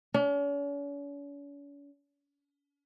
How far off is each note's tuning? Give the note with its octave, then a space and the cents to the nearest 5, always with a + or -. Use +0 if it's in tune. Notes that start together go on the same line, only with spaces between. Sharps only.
C#4 +45